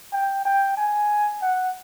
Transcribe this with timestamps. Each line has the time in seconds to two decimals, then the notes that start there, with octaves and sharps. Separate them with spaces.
0.12 G5
0.45 G5
0.77 G#5
1.42 F#5